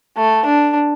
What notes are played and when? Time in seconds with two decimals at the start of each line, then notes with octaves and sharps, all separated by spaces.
0.17 A3
0.45 D4